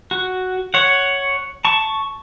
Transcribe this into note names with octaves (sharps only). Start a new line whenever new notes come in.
F#4
C#5 F#5
A5 C#6